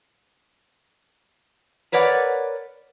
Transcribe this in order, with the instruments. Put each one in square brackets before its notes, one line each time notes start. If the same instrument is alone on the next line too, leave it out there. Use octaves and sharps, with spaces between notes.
[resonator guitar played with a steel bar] A#4 B4 C#5 D5 F#5